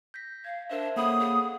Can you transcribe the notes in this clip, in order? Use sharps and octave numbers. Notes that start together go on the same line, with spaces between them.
G6 A#6 B6
F5 G#6
D4 A#4 C5 E5
C#3 A#3 C#4 A4 F#5 B5 D#6
G#4